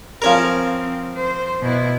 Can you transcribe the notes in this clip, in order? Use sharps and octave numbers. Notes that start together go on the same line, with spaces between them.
F3 C4 C#4 A#4
C5
B2 E4